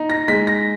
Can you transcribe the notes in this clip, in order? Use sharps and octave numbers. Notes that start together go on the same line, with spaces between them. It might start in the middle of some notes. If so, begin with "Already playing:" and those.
Already playing: D#4
A#6
G#3 B6
A#6